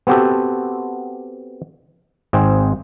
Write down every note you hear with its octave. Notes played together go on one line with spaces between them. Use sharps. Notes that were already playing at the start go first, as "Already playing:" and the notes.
B3 C4 F#4 G4 A4
G#1 G#2 C4 G#4